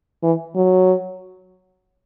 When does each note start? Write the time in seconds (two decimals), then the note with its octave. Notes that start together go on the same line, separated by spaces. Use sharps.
0.23 E3
0.56 F#3